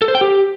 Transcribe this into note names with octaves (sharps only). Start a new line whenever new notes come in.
A4
C5
G5
G4